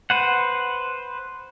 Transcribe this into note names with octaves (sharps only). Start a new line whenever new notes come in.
B4 C5 F#5